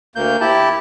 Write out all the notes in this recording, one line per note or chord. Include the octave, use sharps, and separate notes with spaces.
D2 A#3 G6
E4 G4 A5